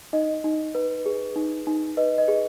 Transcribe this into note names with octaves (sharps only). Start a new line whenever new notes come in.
D#4 D#5
D#4
B4
G#4
D#4
D#4
B4 D#5
D#5
G#4